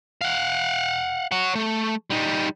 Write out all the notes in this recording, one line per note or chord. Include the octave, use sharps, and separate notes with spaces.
F5 F#5
C#5 F#5
A3
G3 D#4